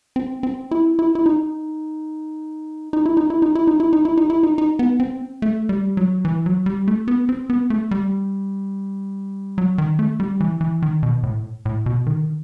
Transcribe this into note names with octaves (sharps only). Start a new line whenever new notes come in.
C4
C4
E4
E4
E4
D#4
D#4
E4
D#4
E4
D#4
E4
D#4
E4
D#4
E4
D#4
E4
D#4
D#4
B3
C4
A3
G3
F#3
E3
F#3
G3
A3
B3
C4
B3
A3
G3
F#3
D#3
A3
G3
E3
E3
D#3
B2
A2
A2
B2
D#3